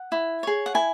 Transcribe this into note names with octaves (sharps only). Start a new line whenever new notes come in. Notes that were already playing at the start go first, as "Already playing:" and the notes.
Already playing: F#5
E4
G#4 C#5
F#5
E4 G#5